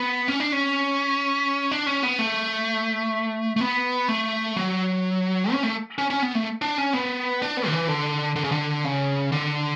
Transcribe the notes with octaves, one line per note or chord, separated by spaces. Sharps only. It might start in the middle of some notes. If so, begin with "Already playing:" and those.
Already playing: B3
C#4
D4
C#4
D4
C#4
B3
A3
A3
B3
A3
F#3
C#4
A3
C#4
C#4
B3
A3
D4
C#4
B3
D4
B3
D3
E3
D3
D3
C#3
D3
C#3
D3